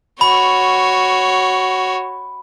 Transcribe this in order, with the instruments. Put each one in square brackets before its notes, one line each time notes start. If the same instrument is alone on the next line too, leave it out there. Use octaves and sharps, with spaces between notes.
[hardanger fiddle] F#4 C#5 [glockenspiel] B5